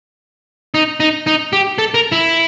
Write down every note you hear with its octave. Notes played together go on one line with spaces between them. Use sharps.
D#4
D#4
D#4
G4
A4
A#4
E4